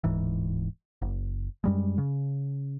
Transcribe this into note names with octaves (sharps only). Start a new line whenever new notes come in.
D1 G#2 E3
F#1
F#2 G3 G#3
C#3